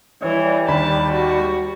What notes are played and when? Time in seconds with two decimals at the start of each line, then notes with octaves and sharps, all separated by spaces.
0.22 E3 G3 C#5
0.68 D#2 A5 B5
1.11 F#4